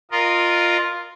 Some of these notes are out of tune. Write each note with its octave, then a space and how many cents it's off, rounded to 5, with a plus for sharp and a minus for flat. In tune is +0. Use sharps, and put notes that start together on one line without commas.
F4 +0 A#4 +0 D#5 -25